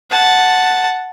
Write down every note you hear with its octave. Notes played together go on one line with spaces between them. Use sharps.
F#5 A5